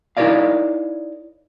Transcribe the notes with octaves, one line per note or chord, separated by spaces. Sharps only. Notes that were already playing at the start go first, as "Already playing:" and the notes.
D#4 E4 A#4 C#5 D5 F5